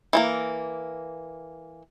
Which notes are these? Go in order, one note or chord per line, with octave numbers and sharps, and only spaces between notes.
E3 G#3 A#3